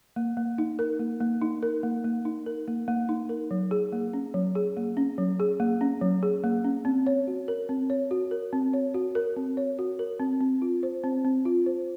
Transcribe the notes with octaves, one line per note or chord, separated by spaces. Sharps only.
A#3
A#3
D#4
A#4
A#3
A#3
D#4
A#4
A#3
A#3
D#4
A#4
A#3
A#3
D#4
A#4
F#3
G#4
A#3
C#4
F#3
G#4
A#3
C#4
F#3
G#4
A#3
C#4
F#3
G#4
A#3
C#4
C4
C#5
F#4
A#4
C4
C#5
F#4
A#4
C4
C#5
F#4
A#4
C4
C#5
F#4
A#4
C4
C4
F4
C5
C4
C4
F4
C5